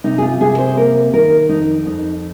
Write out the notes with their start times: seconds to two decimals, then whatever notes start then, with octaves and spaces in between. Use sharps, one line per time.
0.04 C3 D#4
0.18 G#4
0.22 F4
0.41 C3 G#4
0.58 C5
0.76 A#3 A#4
1.13 D#3 A#4
1.49 F2 D#4
1.86 F2 D#4